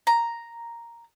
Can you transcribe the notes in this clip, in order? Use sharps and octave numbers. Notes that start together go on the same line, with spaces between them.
A#5